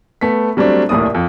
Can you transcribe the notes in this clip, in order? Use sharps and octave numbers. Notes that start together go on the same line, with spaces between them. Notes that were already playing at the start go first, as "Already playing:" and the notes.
A3 B3 B6
F#3 G3 A3 C4 D4
D#1 C2 A2 A#3 D5 D#6
F2